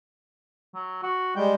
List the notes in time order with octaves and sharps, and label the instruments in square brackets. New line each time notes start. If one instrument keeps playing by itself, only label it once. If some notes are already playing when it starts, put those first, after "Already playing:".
[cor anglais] F#3
F#4
[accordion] G3 G#3 [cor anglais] G5